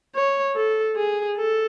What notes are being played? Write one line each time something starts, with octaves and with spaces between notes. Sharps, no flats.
C#5
A4
G#4
A4